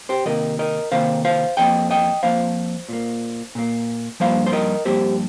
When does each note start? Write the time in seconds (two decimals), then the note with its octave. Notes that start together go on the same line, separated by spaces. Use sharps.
0.09 G4 C5
0.25 C3 D#3 A#3 A#4 D#5
0.59 A#4 D#5
0.92 C3 D#3 A#3 C5 F5
1.25 C5 F5
1.57 F2 F3 A#3 D#5 G5
1.91 D#5 G5
2.23 F2 F3 A#3 C5 F5
2.89 A#2 A#3
3.55 A#2 A#3
4.20 G2 F3 A#3 C5 F5
4.46 C5
4.53 A#4 D#5
4.85 G2 F3 A#3 G4 C5